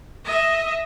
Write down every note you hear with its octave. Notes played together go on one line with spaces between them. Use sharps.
D#5 E5